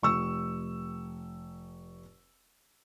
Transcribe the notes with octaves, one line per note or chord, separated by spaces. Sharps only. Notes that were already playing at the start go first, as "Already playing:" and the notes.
F1 C#6 E6